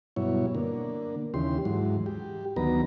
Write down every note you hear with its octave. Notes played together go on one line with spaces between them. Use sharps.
G2 B2 F#3 E4 C#5
D3 A#3
D#2 C#3 E3 G4 C6
G#2 E3 F#3
G4
D2 D#3 F#3 B3 B4 A#5